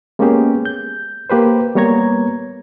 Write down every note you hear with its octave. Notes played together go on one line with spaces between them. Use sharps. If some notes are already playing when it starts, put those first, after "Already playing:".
G#3 A#3 B3 C#4 G4 G#4
G6
A#3 G4 B4 C5
G3 A#3 B3 C#5 A#5 G#6